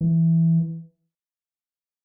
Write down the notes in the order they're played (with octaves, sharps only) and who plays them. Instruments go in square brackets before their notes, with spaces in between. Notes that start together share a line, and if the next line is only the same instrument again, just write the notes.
[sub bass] E3